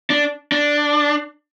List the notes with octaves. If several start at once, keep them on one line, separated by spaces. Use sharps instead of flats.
D4
D4